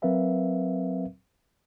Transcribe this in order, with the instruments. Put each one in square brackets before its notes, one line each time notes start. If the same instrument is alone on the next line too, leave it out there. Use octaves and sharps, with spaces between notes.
[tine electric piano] F#3 C4 A#4 B4 E5 F5